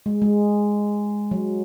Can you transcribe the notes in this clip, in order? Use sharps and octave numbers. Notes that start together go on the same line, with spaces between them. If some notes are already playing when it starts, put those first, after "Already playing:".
G#3
G#3
F#3